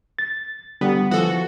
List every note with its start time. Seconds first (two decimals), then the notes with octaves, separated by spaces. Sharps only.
0.19 A6
0.81 D3 G3 B3
1.11 E3 F3 F#4 A4